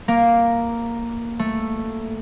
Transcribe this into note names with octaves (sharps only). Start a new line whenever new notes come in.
A#3
A3